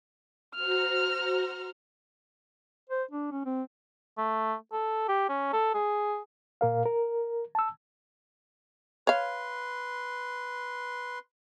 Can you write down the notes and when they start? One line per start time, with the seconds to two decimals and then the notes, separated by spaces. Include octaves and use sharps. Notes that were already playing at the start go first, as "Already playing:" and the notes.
0.55 F#4 C5 A#5 F6
2.90 C5
3.11 D4
3.32 C#4
3.46 C4
4.18 A3
4.72 A4
5.09 G4
5.29 C#4
5.53 A4
5.74 G#4
6.61 A#2 A#4 F5
6.85 A#4
7.55 A5 E6
9.07 B4 C#5 F5 C6